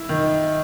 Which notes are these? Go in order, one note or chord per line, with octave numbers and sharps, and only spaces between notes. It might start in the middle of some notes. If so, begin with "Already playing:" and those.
Already playing: E4
D#3